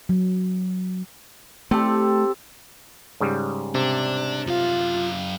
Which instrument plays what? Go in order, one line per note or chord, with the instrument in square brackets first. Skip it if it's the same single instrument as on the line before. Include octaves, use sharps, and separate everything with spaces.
[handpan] F#3
[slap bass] A3 [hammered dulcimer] C4 G4 A4
[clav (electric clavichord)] G#2 C#3 G3
[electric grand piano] C3 [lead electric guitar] D4
[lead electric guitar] F#2 F5 [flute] F4